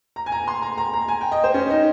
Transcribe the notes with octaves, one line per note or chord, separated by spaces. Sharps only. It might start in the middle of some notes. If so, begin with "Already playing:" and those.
A#5
G#5
A#5
C6
A#5
A#5
A#5
G#5
G5
D#5
C5
C#4
D#4